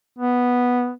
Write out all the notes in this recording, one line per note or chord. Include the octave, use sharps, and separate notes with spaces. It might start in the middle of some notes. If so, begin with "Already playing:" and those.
B3